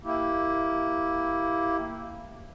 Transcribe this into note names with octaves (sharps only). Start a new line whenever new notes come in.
A#3 E4 G4